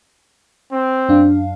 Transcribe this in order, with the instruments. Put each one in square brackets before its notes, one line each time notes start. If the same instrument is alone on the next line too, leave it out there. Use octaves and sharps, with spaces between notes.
[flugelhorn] C4
[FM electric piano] F#2 D4 F5